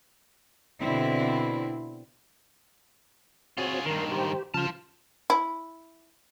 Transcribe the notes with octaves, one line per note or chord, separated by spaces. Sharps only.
B2 D3 C4 E4
C4 F4 F#4 G#4 C#5
G2 D#3 A#4 C6
G4 C5
C#3 F3 F4 A5 F6
E4